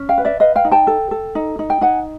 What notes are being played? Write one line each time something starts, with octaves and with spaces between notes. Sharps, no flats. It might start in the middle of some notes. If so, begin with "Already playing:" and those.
Already playing: C#4
F5 G5
B4
D5 E5
B4 D#5 F5
F5 G5
D#4
G5 A5
A4
A4
D#4
D#4
G5
D#4 F#5 G#5